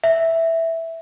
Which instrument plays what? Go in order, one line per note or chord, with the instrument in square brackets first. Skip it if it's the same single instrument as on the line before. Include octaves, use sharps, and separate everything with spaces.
[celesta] E5